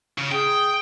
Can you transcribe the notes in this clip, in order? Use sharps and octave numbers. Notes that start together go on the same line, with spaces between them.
C#3
G#4 G5